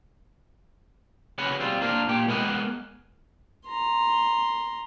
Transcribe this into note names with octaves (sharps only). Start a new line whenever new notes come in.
C#3 C#4 F#4 B4
G3 C4 F4
A#3 D4 F4 A#4
A#2 G4
G#3 B3 A#4 D#5 F#5
A#5 C6